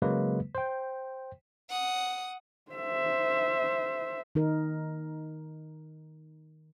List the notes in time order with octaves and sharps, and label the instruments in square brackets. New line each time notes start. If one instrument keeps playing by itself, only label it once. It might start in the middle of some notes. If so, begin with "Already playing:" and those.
[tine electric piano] C#3 F#3 G#3 A#3 B4
C5 G5
[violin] F#5 D#6
[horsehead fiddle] C5 E5
[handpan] D#3 D#4 A#4